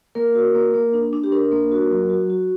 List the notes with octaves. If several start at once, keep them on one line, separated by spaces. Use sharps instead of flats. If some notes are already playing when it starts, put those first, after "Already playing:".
A#3 A#4
F#4
A#3
A#3
D4
D4
G4
D4 A#4
A#3
F#4
F#3
F#4
F#4